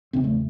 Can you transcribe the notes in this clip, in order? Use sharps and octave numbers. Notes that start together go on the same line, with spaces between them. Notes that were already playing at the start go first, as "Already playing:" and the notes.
E1 D#2 C#3 C4
A3